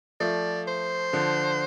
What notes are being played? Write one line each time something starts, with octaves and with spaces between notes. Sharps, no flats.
F3 A3 D5
C5
D3 F3